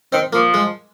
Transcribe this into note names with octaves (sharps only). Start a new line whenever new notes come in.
D#3 C4
F3 A#3
G#3